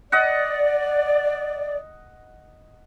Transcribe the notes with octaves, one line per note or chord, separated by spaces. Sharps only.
D5 D#5 F#5